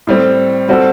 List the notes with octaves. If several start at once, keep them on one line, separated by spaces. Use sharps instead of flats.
A2 G3 C4
G3 C4 F#4 A4